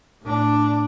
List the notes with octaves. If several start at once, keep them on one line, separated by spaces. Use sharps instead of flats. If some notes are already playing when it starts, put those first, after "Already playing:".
A2 D4